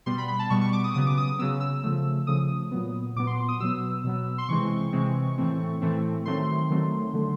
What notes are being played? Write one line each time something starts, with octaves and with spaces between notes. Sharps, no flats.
B2 G3 B3 C6
B5
B5
A5
B2 G3 B3 C#6
C#6
D6
D#6
C#3 F#3 B3 D#6
D6
D#6
D#6
C#3 F#3 B3 E6
E6
C#3 F3 A3
C#3 F3 A3 D#6
A#2 F#3 B3
A#2 F#3 B3 D6
C6
D#6
B2 F#3 B3 E6
B2 F#3 B3
C6
C3 E3 G#3 C4 C#6
C3 E3 G#3 C4
A2 E3 A3 C4
A2 E3 A3 C4
D#3 F#3 A3 C4 C6
D#3 F#3 A3 C4
D3 F#3 A3